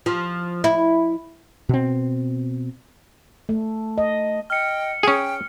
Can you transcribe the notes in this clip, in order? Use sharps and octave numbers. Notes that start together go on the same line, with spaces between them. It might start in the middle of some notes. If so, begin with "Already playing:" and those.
F3
E4
B2 C4
A3
D#5
D#5 G5 F6 C#7
C#4 G#4 G5